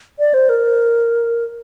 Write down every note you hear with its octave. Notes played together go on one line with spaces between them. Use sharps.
D5
C5
A#4